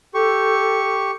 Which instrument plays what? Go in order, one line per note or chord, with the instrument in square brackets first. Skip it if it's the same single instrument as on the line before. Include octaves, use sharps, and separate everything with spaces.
[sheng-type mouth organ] G4 C#6 [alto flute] A4